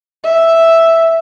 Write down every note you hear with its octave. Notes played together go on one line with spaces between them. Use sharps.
E5